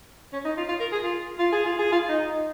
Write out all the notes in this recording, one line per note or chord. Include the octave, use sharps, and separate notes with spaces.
C#4
D#4
F4
F4
A#4
G#4
F4
F4
G#4
F4
G#4
F4
D#4